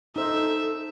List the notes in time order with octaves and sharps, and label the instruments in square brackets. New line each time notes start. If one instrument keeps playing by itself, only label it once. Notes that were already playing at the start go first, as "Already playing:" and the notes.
[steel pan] D#4 C5 [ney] A4 [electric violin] E5